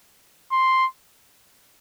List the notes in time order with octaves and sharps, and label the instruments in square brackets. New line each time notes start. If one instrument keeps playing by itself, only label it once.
[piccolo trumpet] C6